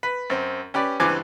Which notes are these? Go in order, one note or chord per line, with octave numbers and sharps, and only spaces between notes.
B4
F#2 C4
C#4 G4 B4 D5
C#2 G2 E3 C4 G#5 D6